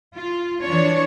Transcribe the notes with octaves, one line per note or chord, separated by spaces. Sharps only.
F4
E3 D4 C#5